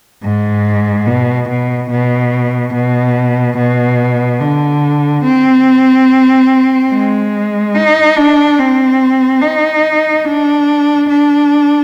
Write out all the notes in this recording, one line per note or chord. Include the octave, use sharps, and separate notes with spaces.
G#2
B2
B2
B2
B2
B2
D3
C4
G#3
D#4
D4
C4
D#4
D4
D4